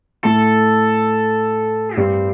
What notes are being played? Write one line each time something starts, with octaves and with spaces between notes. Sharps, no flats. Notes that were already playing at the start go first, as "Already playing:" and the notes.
A2 A3 A4
G2 G3 C4